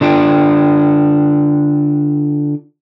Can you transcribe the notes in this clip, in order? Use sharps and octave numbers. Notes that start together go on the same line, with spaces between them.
D3 D4 F4 F#5 G5